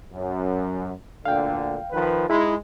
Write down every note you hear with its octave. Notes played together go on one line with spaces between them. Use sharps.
F#2
D2 A#2 D3 F5 G5
D#3 F3 B4
G#3 D#4 E4 B5